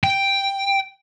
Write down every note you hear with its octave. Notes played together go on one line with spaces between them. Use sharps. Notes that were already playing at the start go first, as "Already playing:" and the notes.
G5